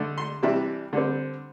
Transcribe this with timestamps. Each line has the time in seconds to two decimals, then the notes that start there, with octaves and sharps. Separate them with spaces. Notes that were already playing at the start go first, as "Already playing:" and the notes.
Already playing: D3 A3 D4
0.18 C6
0.43 C3 E3 G3 D4 E5
0.93 D3 G3 C4